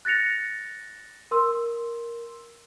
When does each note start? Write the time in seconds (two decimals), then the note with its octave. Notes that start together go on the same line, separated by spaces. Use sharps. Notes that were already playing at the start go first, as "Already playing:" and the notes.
0.05 F#6 A6 A#6 C#7 F7
1.31 A#4 C6 E6